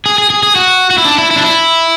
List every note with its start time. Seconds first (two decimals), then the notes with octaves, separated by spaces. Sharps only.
0.06 G#4
0.18 G#4
0.30 G#4
0.43 G#4
0.56 F#4
0.91 F#4
0.98 E4
1.05 D4
1.18 E4
1.31 E4
1.36 D4
1.43 E4